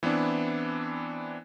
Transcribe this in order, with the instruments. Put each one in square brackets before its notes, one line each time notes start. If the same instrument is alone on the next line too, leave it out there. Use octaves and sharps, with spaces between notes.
[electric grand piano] E3 B3 C4 D4 E4